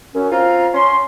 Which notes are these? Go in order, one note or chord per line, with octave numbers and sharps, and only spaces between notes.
F#2 C#4
C4 F4 F5 A#5
C#4 C6